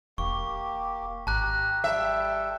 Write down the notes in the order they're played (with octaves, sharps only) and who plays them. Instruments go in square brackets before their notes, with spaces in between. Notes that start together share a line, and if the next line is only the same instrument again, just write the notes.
[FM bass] E1 [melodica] A#3 G4 [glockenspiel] C#6
[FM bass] G#1 [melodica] G4 A#5 [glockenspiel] A5 F#6
[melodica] G3 A4 G5 [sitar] E5